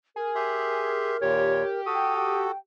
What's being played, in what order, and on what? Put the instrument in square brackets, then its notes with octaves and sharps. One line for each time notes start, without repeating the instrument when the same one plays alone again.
[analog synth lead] G#4 [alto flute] A#4
[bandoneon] G4 E5 C6
[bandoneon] D#2 A#2 [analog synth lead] G4 [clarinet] C#5
[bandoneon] F#4 A4 [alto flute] G5 [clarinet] D#6